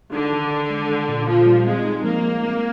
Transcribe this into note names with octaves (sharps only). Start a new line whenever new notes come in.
D3 D#4
D#3
D#3
G#3
D4
A#2
A#2 F3
G3
G#3 C4
D#4
F3 A#3
G#3
C4